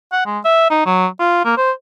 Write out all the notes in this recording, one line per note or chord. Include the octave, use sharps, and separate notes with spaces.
F#5
G#3
E5
D#4
F#3
F4
A#3
C5